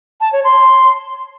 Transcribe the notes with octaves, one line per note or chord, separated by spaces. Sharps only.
A5
C#5
C6